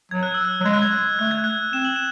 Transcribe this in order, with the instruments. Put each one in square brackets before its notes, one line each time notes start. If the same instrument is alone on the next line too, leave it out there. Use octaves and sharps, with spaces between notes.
[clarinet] F#3 [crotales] G#6
[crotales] F#6
E6
F#6
[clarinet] F#3
[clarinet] G#3 [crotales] G#6
[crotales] F#6
G#6
[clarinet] A3 [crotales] F#6
[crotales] G#6
F#6
[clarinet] C4 [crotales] E7
[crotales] F#7
E7